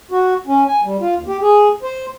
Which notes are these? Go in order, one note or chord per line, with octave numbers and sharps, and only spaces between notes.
F#4
C#4
G#5
G3
F4
D#2
G4
G#4
C5